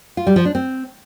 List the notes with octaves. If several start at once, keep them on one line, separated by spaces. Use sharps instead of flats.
F4
G3
F3
D4
C4